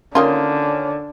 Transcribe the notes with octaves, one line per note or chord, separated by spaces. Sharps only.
D3 D#3 A#3 C#4 F4